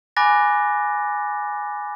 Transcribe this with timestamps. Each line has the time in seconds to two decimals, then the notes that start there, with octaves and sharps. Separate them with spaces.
0.17 G#5 B5 D6 F#6 A6 A#6